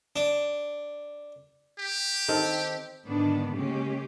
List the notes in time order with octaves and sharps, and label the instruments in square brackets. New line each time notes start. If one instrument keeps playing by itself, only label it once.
[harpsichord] D4
[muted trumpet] G4
[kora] D#3 C4 A4
[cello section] G#2 D3 D#3 B3 D4
C#3 G#3 A#3 C#4 G4